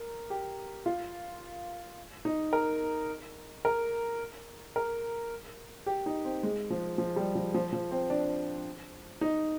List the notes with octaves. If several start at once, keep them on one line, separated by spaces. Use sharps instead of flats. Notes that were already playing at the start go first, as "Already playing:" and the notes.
Already playing: A#4
G4
F4
D#4
A#4
A#4
A#4
G4
D#4
C4
G#3
F3
F3
G3
F3
F3
F3
C4
D4
D#4